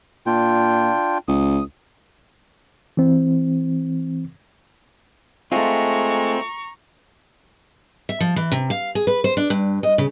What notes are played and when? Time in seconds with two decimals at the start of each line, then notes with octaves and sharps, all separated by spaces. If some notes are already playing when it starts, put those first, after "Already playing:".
0.26 A#2 D4 F4 G5
1.28 C#2 D#6
2.97 E3 C4
5.52 G#3 A3 C4 F4 A#5 C#6
8.09 E5
8.20 F3
8.36 E3
8.52 C3
8.70 F5
8.95 G#4
9.07 B4
9.24 C5
9.37 D4
9.50 G2
9.83 D#5
9.98 C#3